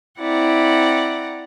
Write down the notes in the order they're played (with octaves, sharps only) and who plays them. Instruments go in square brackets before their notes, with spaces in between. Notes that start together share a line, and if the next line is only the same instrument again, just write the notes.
[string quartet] C4 E4 D5 F#5 A#5